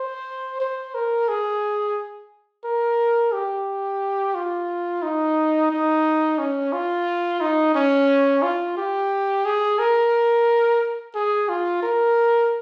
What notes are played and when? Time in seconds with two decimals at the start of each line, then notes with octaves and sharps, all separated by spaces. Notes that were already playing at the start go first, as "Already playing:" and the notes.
Already playing: C5
0.60 C5
0.94 A#4
1.28 G#4
2.64 A#4
3.32 G4
4.35 F4
5.02 D#4
5.70 D#4
6.38 C#4
6.73 F4
7.41 D#4
7.75 C#4
8.43 F4
8.77 G4
9.45 G#4
9.79 A#4
11.15 G#4
11.49 F4
11.83 A#4